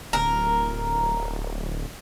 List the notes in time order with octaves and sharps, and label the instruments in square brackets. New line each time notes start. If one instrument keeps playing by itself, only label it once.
[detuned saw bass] D1 [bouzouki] A#4